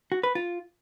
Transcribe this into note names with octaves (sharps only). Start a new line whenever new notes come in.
F#4
B4
F4